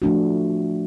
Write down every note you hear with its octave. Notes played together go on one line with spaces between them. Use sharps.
F3 A3 D4 F#4